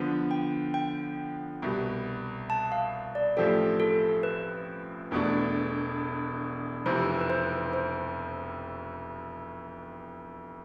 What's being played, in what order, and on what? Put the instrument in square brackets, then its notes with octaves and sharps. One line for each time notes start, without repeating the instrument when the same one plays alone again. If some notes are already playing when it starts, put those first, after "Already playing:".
Already playing: [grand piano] D3 F3 B3
[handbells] G5
G5
[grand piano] C2 B2 G3
[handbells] A5
F5
D5
[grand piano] A1 A2 F3 C4 G4 [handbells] A4
[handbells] A4
B4
[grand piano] E1 E2 B2 A3 D4
[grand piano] F1 F2 C3 E3 [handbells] C5
[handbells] B4
C5
C5